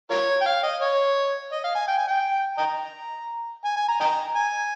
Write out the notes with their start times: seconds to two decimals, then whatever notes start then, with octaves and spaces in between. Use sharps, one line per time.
0.10 F4 A#4 C#5
0.41 G5
0.46 F5
0.63 D#5
0.81 C#5
1.52 D#5
1.64 F5
1.75 G#5
1.88 G5
1.98 G#5
2.07 G5
2.58 D#5 G5 A#5
3.64 G#5
3.76 G#5
3.88 A#5
4.00 D#5 G5 A#5
4.35 G#5